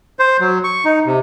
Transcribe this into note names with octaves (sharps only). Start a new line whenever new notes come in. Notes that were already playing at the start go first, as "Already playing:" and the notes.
C5
F#3
C#6
D#4
C3